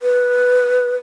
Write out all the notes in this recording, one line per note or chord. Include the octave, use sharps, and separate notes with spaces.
B4